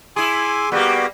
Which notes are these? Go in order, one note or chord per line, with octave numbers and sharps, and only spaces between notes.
E4 G#4 G#5 C6 D6
G3 A#3 B3 F#4 G4